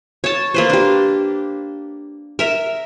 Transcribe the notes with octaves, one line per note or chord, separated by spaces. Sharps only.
C#5 A5
A#3 B4 C5
D4 G4
A#4 E5 A#5